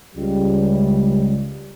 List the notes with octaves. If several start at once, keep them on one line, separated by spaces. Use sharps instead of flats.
C#2 G3